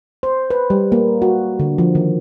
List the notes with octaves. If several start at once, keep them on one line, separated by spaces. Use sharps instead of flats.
C5
B4
G3
A#3
F#4
D3
F3
D#3